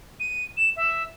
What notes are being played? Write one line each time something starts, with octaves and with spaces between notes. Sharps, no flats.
D#7
E7
E5